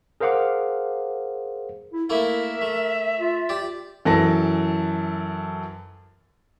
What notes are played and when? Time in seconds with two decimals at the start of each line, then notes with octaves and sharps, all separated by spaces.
0.20 G#4 A#4 C5 F5 F#5 D6
1.93 E4
2.10 A3 A#3 E4 A#4 E5
2.61 A3
3.18 F4
3.49 G4 D5
4.05 F#2 E3 A4 A5 A#6